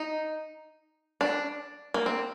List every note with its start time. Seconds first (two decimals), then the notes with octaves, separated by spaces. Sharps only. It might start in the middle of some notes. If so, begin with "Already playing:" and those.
Already playing: D#4
1.21 D4
1.94 A#3
2.06 C4